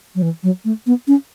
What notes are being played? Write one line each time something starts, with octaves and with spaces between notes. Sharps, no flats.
F#3
E3
F#3
A3
B3
C#4